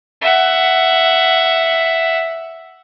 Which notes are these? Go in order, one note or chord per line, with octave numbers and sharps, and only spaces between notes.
E5 F#5